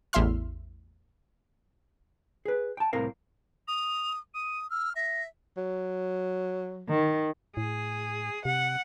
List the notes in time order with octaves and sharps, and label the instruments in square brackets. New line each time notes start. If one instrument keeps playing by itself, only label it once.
[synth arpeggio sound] A1 E2 E4 E5 C6 F6
[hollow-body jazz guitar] G#4 B4
G5 A5
C2 A2 C4 A#4 F5
[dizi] D#6 [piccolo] F7
[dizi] D#6 [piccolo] D#7
[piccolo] E6 [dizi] F6
[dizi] E5 [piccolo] A#6
[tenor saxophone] F#3
[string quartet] D#3
[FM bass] A2 [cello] G#4
[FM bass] C3 [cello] F#5